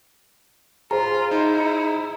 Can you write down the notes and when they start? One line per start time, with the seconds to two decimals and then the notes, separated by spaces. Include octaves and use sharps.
0.91 F4 G#4 C5 A#5
1.31 D#4 E4